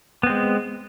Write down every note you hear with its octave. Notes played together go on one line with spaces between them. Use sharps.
G#3 B3 C4